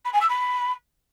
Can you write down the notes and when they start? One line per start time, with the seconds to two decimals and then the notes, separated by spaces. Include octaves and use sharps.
0.05 B5
0.13 G#5
0.21 E6
0.29 B5